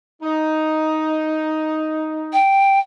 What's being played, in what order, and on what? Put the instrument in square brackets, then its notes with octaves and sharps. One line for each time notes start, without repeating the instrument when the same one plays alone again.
[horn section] D#4
[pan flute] G5